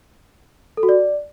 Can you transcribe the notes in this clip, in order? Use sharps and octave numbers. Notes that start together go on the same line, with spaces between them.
A4
F#4
D5